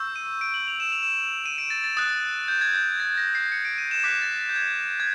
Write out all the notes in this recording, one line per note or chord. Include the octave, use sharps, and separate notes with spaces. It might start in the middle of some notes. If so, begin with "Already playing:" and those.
Already playing: C#6 E6 G6
D#7
D7
F#7
F7
E7
F7
E7
D#7
D7
A6
A6
D#6 F#6 A6
G6
G#6
G6
A6
A#6
C7
C#7
D7
D#7
E7
D6 F#6 B6
A6
A6
G6
G#6
G#6